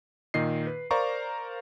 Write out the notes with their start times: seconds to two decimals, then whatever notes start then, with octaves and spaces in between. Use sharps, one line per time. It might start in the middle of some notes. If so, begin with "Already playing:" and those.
0.34 A#2 D#3 D#5 C7
0.67 B4
0.91 A#4 C5 D5 F5 A#5 C#6